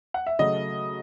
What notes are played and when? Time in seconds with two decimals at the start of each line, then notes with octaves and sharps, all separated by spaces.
0.14 F#5
0.26 E5
0.39 C#3 F#3 A3 D#5